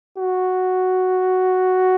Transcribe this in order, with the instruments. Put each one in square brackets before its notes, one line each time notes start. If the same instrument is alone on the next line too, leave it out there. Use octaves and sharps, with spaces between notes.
[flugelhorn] F#4